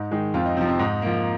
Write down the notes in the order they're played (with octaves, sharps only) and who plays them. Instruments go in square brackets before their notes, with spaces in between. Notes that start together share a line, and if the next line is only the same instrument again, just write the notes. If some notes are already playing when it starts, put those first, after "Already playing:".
Already playing: [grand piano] G#2 D#4
D#3 G#3
F2 C4 F4
D#4
C3 F3 C4
C4
G#2 D#4
F3 A#3